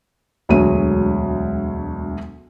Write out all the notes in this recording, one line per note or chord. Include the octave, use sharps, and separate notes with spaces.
E1 D2 F#3 G#3 D#7